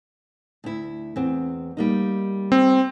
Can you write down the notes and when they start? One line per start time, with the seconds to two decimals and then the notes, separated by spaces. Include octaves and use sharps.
0.64 D2 E4
1.16 E2 C4
1.77 G3 A#3 D#4
2.52 C4